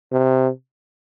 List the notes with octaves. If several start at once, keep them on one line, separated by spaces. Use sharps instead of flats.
C3